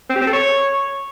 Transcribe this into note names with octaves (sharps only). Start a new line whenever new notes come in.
C4
G4
C4
A4
C#5